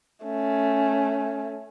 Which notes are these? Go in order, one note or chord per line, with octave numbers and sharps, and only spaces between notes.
A3 C#4